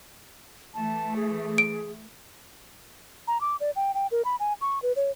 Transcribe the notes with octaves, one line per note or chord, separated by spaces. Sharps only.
E3 A3 A5
G#4
D7
A#5
D6
D5
G5
G5
A#4
B5
G#5
C#6
B4
C#5